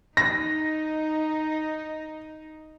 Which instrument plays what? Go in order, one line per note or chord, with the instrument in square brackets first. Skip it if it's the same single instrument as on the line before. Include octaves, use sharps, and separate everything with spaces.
[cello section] D#4 [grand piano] A#6